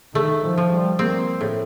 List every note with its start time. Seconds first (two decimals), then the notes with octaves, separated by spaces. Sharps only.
0.14 D#3 A3
0.43 F3
0.58 F3
0.71 G3
0.99 A#3 C4
1.41 A2